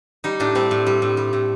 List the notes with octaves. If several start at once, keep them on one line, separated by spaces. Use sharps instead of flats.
G3 D#4
A2 D4
G3 C4
A2
G3
A2
G3
A2